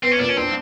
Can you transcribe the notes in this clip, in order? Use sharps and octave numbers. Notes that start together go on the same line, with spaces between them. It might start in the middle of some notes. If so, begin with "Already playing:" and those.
B3 C4
C#4
A#2 D4
C#4
C4 D4